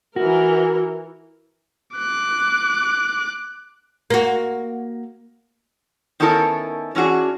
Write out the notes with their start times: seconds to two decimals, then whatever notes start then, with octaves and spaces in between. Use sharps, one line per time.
0.16 E3 F#4 A#4
1.96 D6 F#6
4.10 A#3 F#4
6.20 D#3 B3 C#4 E4 A4 A#4
6.95 E3 C#4 D4 F#4 G#4